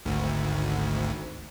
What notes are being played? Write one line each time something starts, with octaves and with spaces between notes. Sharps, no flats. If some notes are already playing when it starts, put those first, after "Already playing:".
G#1 D2